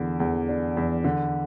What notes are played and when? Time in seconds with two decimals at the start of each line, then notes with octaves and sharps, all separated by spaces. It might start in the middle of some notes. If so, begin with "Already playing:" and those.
Already playing: E2 D3
0.20 E2
0.49 D4
0.77 E2
1.04 D3